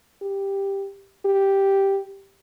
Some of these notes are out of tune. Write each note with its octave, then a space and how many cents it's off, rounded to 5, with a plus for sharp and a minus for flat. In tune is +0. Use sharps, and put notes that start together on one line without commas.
G4 +5
G4 +0